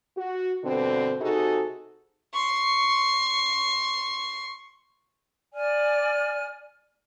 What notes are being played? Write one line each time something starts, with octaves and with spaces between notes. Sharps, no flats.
F#4
G2 B2 D3 C4
C3 D#4 F#4 G#4 A4
C6 C#6
D5 G#5 F6